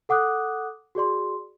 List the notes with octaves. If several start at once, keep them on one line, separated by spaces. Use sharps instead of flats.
A4 F#5 D6 D#6 F#6
F#4 G#4 D5 C6